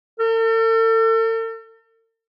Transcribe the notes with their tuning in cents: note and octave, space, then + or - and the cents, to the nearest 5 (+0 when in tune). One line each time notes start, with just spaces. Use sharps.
A4 +45